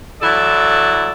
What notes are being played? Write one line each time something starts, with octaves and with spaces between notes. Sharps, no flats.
E3 F#3 E4 A4 D5